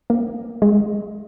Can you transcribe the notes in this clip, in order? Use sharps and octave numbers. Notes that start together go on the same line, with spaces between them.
A#3
G#3